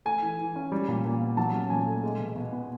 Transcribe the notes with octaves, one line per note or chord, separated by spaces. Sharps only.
A3 G#5
E3
E3
C#4
G3
A#2
A#2
B3
F#3 A5
C#4
A#2 G#5
A3
G#3
B2
B2
B3